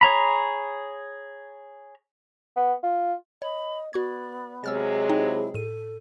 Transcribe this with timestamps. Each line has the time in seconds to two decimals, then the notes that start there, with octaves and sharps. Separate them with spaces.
0.01 G#4 C#5 A#5 B5
2.57 B3
2.83 F4
3.42 C#5 D#5 B5
3.93 B3 F#4 D5 C#6 G#6
4.64 C3 F#3 G#3 G#4 E6 F6 A6
5.09 D#4 E4 D#5 G5
5.54 A2 A4 D#7